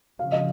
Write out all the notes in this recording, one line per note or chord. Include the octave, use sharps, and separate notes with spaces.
C#3 F3 F5
D#5